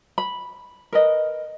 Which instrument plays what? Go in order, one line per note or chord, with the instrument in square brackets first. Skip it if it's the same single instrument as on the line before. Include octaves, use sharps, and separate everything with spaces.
[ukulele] B5
A#4 B4 D#5